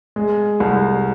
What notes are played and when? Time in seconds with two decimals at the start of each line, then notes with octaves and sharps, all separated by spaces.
0.16 G#3
0.60 C2